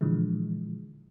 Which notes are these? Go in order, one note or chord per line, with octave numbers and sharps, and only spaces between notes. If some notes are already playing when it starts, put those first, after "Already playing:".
A#2 D3 E3 F3 G#3